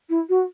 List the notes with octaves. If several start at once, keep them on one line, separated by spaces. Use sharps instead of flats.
E4
F#4